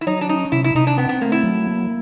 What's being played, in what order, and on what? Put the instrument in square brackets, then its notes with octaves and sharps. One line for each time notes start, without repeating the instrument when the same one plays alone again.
[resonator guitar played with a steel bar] E4
[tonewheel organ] F#3 [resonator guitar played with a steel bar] D#4
[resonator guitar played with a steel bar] D4
[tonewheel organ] C#4 [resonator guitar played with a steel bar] D#4
[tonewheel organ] C3 [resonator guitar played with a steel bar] E4
[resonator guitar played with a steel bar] E4
[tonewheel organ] C3 [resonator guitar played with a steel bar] D#4
[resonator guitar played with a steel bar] D4
[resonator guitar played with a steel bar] B3 [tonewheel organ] C4
[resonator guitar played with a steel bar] B3
[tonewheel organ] A3 [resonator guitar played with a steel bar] A#3
[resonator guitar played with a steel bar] E4
[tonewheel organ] F#3
A#3